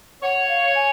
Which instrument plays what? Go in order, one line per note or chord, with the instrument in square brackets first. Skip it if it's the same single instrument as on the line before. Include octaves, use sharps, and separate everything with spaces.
[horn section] C#5 [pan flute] F#5
[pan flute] F5
G#5